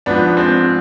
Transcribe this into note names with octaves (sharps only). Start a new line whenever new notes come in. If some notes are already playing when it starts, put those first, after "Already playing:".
G#2 F3 B3 D4
D4
G#3 C4